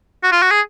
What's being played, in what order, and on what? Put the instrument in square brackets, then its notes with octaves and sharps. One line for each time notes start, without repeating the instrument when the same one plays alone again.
[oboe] F#4
F4
F#4
G#4